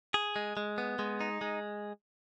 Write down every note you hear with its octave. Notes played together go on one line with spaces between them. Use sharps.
G#4
G#3
G#3
B3
G#3
D#4
G#3